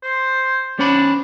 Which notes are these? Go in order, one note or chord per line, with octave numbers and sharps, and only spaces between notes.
C5
C#4 D4 C5 B5